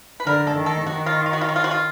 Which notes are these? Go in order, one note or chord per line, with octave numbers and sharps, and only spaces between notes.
B4
D3 A#4
A4
D#3
A4
D#3 F#4
F4
F4
F#4
F4
F#4
F4
F#4
F4